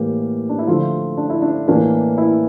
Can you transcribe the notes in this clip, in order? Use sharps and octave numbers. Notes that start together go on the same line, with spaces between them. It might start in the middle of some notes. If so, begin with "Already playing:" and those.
Already playing: A2 E3 A#3 G4
D4
E4
D3 F3 A3 F4
D4
E4
D4
A2 E3 A#3 D4
E4